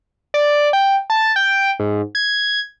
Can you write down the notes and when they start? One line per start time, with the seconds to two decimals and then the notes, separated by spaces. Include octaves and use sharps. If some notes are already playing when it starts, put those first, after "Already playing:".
0.34 D5
0.73 G5
1.10 A5
1.36 G5
1.79 G#2
2.15 G#6